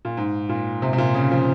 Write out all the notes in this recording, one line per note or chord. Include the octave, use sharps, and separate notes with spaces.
A#2
G#2
A#2
C3
C3
A#2
C#3
F3